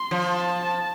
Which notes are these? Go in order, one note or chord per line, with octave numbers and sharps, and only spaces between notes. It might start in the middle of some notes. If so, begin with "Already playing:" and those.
Already playing: C6
F3
A5